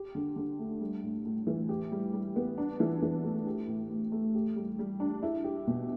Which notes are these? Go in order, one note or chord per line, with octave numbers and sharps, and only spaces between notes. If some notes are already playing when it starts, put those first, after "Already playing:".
Already playing: G4
D3
D3
A3
G3
A2
A2
E3
G4
G3
G3
B3
D4
E3
E3
A3
G4
A2
A2
A3
G4
G3
G3
D4
E4
G4
B2